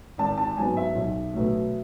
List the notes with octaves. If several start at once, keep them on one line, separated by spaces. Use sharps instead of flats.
G#1 A5
A5
G#2 F#3 B3 G#5
E5
B1
B2 F#3 A3